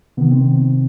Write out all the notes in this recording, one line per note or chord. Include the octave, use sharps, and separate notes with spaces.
C3 D#3 B3
C4